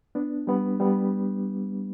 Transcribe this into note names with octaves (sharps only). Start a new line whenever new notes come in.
B3 D4
G3 B3
G3 B3